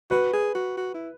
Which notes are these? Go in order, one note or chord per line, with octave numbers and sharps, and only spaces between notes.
F#4 B4
G#4
F#4
F#4
E4